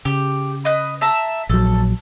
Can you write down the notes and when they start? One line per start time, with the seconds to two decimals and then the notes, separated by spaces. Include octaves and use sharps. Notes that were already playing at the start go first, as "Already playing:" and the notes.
0.05 C#3 G4
0.65 B4 D#5
1.01 E5 A5 A#5
1.49 A#1 F#3 A4